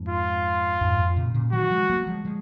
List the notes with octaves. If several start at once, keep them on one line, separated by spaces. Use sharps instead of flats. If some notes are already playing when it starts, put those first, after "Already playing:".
Already playing: F2 G#2
F4
F2 G#2
F2
A#2 C#3
A#2 C#3
D#3 F#3 F#4
F3 G#3
F#3 A#3
F3 G#3
F3 G#3